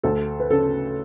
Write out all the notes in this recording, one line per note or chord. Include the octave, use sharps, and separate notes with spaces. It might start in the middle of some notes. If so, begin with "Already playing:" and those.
D2 A4
B4
C#3 A4